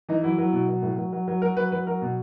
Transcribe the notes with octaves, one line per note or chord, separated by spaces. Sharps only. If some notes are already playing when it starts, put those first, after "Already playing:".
E3 D#4
F#3 E4
F#3
B2
F#3
A2
F#3
F#3
F#3
F#3 A#4
F#3 B4
F#3 B4
F#3 A#4
B2